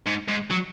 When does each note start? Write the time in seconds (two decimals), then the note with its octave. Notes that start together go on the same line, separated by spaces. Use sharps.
0.07 G#2
0.29 G#2
0.51 F#3